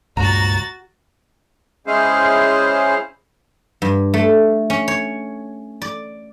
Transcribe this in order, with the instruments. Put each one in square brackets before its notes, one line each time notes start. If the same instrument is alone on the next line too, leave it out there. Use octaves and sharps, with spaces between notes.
[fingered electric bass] C#2 A#2 [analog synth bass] G2 [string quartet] F#4 A6 [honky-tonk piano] A#5
[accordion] G#3 C#4 E4 G#4 C5 F5
[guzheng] G2
A3
C#4
C#5
D5